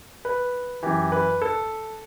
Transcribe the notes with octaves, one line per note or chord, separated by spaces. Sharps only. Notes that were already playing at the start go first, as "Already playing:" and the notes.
B4
F#2 E3 G4
B4
A4